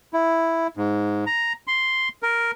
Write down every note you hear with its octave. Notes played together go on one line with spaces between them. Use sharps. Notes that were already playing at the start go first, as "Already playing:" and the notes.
E4
G#2
A#5
C6
A#4